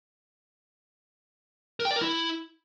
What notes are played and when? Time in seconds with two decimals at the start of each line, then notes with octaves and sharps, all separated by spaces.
1.80 A#4
1.85 G5
1.91 D5
1.96 A#4
2.02 E4